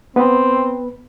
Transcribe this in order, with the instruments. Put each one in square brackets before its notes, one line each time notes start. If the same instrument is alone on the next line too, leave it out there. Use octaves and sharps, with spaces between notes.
[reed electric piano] B3 B4 [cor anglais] C4